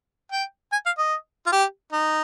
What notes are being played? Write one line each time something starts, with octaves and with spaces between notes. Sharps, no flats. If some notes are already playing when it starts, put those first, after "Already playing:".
G5
G#5
F5
D#5
F4
G4
D#4